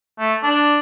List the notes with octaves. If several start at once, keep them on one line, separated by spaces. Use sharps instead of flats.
A3
D4